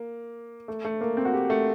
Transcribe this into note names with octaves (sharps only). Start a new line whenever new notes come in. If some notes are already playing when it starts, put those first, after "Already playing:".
Already playing: A#3
A3
A3
A#3
C4
F#4
G4
A3